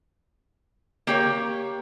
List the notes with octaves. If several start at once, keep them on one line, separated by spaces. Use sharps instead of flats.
A#3 G4 C#5